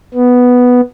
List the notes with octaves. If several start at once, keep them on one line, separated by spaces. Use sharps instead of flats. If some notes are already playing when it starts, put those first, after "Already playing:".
B3